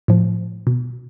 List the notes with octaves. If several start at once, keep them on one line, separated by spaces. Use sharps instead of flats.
A2 F3
B2